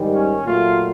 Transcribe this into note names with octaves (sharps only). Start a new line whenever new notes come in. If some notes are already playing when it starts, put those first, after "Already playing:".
Already playing: G#2 D#3 G3
C#4
A#2 F#3 A3 F4